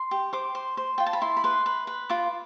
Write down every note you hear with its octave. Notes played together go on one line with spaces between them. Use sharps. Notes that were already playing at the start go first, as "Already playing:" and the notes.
Already playing: C6
G4
C5 D6
C5
C5
F4 G5
A5
B5
E4 C6
B5
B4 C6
B4
B4
F4 D6